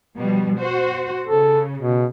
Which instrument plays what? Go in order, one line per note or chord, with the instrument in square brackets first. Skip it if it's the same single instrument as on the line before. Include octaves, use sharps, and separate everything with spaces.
[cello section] B2 F3 G3
F#4 C5
[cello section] C#3 [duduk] A4
[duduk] B2